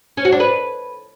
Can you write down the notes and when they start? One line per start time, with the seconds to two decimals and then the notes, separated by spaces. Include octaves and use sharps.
0.17 C#4
0.25 F#4
0.32 D4
0.40 B4